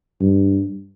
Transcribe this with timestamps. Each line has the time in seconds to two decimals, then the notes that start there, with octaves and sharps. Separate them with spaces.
0.21 G2